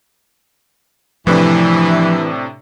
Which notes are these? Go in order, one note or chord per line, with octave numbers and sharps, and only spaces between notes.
A2 C3 E3 F3 D4